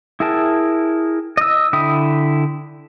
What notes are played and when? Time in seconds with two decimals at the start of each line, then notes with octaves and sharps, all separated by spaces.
0.20 E4 G#4 A#4 G5 A5
1.37 D#5 E6
1.73 D3 E4 G5 D#6